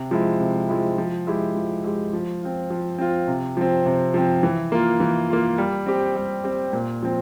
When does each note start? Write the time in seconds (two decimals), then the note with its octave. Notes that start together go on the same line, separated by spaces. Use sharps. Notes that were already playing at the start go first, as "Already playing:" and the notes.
Already playing: C3
0.11 F3 G#3 E4
0.40 C3
0.69 F3 G#3 E4
0.98 F3
1.27 G#3 E4 G4
1.55 F3
1.84 G#3 E4 G4
2.13 F3
2.42 C4 F4
2.70 F3
2.98 C4 F4
3.28 C3
3.57 F3 C4
3.86 C3
4.14 F3 C4
4.43 E3
4.72 A#3 F4
5.00 E3
5.30 A#3 F4
5.58 G3
5.86 C4 G4
6.16 G3
6.44 C4 G4
6.73 A#2
7.03 F3 C4